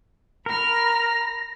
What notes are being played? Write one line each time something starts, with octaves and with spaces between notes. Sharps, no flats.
A#4 B5 F6 A#6